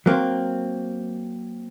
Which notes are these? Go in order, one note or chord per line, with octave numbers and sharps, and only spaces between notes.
F#3 A#3 C4